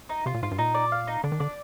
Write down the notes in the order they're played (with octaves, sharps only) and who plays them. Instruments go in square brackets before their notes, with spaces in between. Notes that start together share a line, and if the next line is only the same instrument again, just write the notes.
[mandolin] D#4
[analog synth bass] C3 [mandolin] F4
[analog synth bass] A#2
[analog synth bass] G#2 [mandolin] F4
[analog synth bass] G2
[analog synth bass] A#2 [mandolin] D#4
[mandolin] D5
F5
D#4
[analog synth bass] D3 [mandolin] D4
[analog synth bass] D#3
[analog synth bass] D3 [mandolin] D5